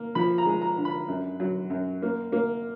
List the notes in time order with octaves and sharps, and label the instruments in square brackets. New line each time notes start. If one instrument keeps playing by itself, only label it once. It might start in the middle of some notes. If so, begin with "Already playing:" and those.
Already playing: [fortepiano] A#3
F3 B5
A#5
G#3
A#5
D3
B5
F#2
F#3
F#2
A#3
A#3